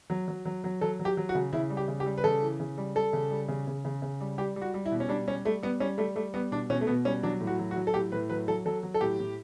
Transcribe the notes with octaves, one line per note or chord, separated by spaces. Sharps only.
F#3
F#3
F#3
F#3
F#3 A4
F#3
G4
F#3
F#4
C#3
C#3 E4
G3
G4
C#3
G4
G3
B4
C#3 A4
E3
C#3
G3
G3 A4
C#3
G3
C#3
C#3
C#3
C#3
G3
G3 G4
G3
F#4
G3
E4
B2
C#4
G3 D4
G3 C#4
G3 A3
G3 B3
G3 C#4
G3 A3
G3 A3
G3 B3
B2 D4
B2 C#4
A3
B2 B3
G3 C#4
F#3 D4
A2
F#4
F#3
F#4
F#3
A4
A2 G4
A2 B4
F#3 B4
F#3 A4
F#3 A4
F#3
A4
A2 G4
A2